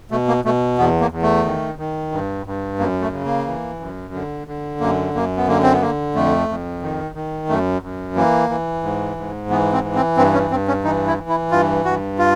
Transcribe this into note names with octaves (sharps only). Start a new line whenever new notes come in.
B2 A3
A#3
B2 A3
E2 B3
A#3
E2
A3
D#3
D#3
G2
G2
F#2 A#3
A3
C#3
A#3
E3
F#2
D3
D3
F#2 A#3
F#2 A#3
B3
D3 A#3
C4
B3
D3 A#3
F2 A3
F2
D#3
D#3
F#2 A3
F#2
E3 A#3
E3
G#2
G#2
E3 B3
C4
E3
C4
G2 C4
C#4
G2 C4
C#4
E3 D#4
E4
E3
E4
G2 F4
G2 F#4
F4